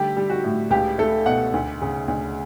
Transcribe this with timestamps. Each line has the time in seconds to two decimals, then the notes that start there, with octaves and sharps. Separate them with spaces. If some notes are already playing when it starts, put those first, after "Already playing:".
Already playing: D3 G3 A3 G4
0.16 G3
0.30 F#4
0.44 A2
0.70 C#2 G4
0.98 A3 A4
1.26 B2 F#5
1.54 D2
1.82 C#3
2.08 D2